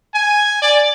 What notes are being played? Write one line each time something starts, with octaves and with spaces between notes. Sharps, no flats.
G#5
D5